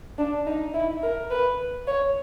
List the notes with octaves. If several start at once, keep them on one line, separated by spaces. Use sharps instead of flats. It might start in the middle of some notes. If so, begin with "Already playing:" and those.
D4
D#4
E4
A#4
B4
C#5